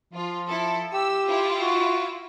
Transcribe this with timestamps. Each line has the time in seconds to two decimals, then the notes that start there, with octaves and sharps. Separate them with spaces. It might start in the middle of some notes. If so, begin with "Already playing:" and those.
0.13 F3 F4
0.47 E4 A4
0.93 G4 E6
1.28 E4 F4
1.61 F#4